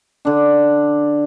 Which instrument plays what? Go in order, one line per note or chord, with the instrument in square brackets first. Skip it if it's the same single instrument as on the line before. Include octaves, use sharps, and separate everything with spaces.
[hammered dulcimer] D3 D4